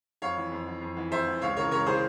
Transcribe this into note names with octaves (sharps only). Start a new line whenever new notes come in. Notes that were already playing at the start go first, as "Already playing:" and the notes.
F2 C#5 F5
E3
F2
E3
F2
E3
F2 C5 E5
E3
C#2 C#5 F5
C#3 E3 A#4 C#5
C#2 A#4 C#5
C#3 E3 G#4 C5